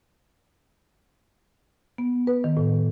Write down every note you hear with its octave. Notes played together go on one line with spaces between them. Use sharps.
B3
B4
D#3
A2